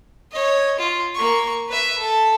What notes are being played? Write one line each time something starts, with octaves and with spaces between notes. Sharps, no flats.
C#5 D#5
F4
A#3 C#6
B4 E5
A4